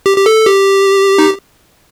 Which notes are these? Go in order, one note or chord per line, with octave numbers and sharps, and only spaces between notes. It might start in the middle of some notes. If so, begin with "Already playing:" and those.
G4
G4
A4
G4
D#4